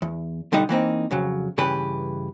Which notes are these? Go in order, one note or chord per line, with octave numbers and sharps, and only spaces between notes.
E2
B1 D3 G3 D#4 D#5 F#5
E3 A#3 C4 D#4
F2 C#3 F#3
G2 C#3 E3 G4 B4